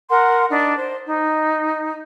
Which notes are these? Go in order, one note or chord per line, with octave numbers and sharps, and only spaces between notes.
A#4 F#5 C6
D4 D#4
C5
D#4